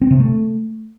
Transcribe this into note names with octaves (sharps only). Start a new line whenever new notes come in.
C4
C3
A3